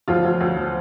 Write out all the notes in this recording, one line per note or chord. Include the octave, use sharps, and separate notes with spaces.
D2 F3 F4
D2
D2
F3